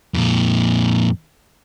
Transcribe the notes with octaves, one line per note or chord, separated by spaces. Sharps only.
F2 A#2